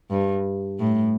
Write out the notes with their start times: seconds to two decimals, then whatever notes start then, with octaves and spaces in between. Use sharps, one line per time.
0.10 G2
0.79 A2